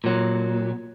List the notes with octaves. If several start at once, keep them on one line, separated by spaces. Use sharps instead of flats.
A#2 F#3